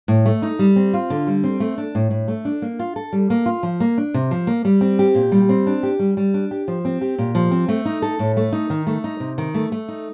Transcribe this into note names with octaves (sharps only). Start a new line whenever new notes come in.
A2
A3
D#4
G3
C4
F4
D3
G3
C4
A3
D4
A2
A2
A3
D4
A#3
F4
A4
G3
A#3
F4
F3
A#3
D4
C3
F3
A#3
G3
C4
G4
A#2
G3
C4
D4
G4
G3
G3
D4
G4
F3
C4
G4
A#2
F3
C4
A3
D#4
A4
A2
A3
D#4
D#3
A3
D#4
C3
D#3
A3
A3
D#4